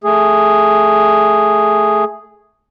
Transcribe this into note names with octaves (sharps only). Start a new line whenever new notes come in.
A3 G#4